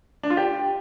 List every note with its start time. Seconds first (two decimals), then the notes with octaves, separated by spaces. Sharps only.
0.23 D4
0.30 F4
0.37 G4